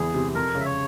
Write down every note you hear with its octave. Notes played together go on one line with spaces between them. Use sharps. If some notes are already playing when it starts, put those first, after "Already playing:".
Already playing: E2 E3 G#3 G#4
C3
F2 A#4
C#3
E5
C#5